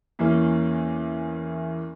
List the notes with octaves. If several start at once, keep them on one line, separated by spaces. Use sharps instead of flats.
E2 E3 A#3 C#4